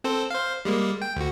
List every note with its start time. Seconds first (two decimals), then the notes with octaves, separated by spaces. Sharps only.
0.04 C4 A4 C5
0.30 C5 F5
0.65 G3 G#3 A#3
1.02 G5
1.16 D2 F#4